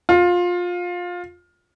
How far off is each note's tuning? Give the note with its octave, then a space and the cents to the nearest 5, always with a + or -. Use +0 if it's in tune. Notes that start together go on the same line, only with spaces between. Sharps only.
F4 +20